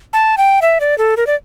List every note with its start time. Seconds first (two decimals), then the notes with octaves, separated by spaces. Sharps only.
0.13 A5
0.37 G5
0.62 E5
0.80 D5
0.98 A4
1.17 A#4
1.27 D5